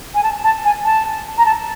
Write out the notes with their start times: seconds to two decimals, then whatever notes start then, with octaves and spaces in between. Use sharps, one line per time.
0.15 G#5
0.24 A5
0.44 A5
0.65 G#5
0.85 A5
1.38 A#5
1.46 A5